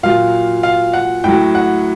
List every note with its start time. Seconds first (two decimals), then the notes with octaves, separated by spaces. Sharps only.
0.03 A#2 F#3 F5
0.63 F5
0.93 F#5
1.24 A2 F#3 G5
1.55 F#5